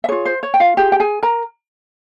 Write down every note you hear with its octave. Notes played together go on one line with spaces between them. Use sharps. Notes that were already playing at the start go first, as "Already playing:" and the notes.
E5
F4 G#4 C#5
C5
C#5
G5
F4 F5
F4 G4 G#4 G5
G5
G#4 G#5
A#4 A#5